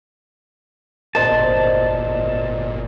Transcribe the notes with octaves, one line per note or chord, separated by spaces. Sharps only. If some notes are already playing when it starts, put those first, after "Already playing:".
G1 A#2 A#4 C5 D5 D#5 A5